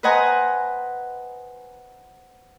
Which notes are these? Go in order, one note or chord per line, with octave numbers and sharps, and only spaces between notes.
B4 C5 D#5 F#5 G#5 A#5